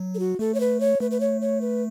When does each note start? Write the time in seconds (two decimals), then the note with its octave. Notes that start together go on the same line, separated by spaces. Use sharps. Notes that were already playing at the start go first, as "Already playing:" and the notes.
Already playing: F#3
0.15 A4
0.19 F#4
0.39 A3 A4
0.54 C#5
0.60 B4
0.80 C#5
1.00 A3 B4
1.11 B4
1.20 C#5
1.41 C#5
1.61 B4